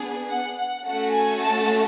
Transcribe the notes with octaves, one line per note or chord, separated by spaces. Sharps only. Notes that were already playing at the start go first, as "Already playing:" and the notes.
Already playing: B3 D4 G#4
F#5
F#5
A3 C#4 F#4 A4 F#5
G#5
A5